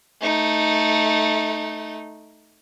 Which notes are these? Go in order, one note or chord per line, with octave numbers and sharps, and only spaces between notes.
A3 D#4